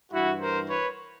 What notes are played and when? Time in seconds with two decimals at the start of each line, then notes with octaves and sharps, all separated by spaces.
0.12 G2 E3 E4 F#4
0.40 A#4 C5
0.68 B4 C#5